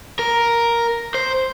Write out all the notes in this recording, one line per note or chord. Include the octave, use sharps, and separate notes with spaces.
A#4
C5